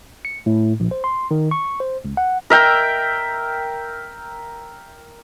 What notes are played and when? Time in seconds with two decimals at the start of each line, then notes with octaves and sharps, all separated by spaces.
0.25 C#7
0.46 A2
0.80 A#1
0.91 C5
1.04 C6
1.31 D#3
1.51 C#6
1.80 C5
2.05 C#2
2.17 F#5
2.50 A#4 E5 G5